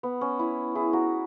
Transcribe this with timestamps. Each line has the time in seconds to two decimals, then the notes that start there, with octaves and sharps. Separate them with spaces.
0.03 B3
0.21 C#4
0.39 E4
0.75 E4 G#4
0.93 F#4 A#4